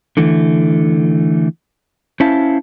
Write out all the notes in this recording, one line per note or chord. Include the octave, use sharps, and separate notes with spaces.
D3 E3 A3
C#4 E4 C5 E5 F5 A5